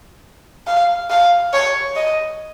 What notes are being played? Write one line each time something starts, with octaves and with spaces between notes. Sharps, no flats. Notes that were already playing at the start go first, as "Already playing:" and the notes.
F5
F5
C#5
D#5